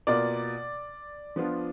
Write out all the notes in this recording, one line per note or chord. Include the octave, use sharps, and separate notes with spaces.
B2 A#3 F4 D5
F3 B3 D4 F4